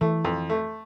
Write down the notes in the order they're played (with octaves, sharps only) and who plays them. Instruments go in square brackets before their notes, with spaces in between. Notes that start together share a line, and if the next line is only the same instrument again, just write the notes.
[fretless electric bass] E3 [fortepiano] A3
[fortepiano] F2
A3